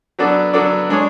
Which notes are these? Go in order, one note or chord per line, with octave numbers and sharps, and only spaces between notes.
F#3 B3 D4 A4 D5
F#3 B3 D4 A4 D5
G#3 D4 G#4 C#5